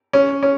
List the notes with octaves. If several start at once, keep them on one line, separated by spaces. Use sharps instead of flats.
C#4
C#4